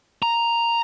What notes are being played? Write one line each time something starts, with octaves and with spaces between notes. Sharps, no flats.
A#5